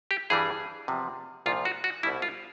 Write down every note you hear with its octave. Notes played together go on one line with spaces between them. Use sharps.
G4
G2 E3 G3 G#4
E2 C3 F3
C2 A#2 F3 F4
F#4
F#4
C2 B2 G3 E4
F4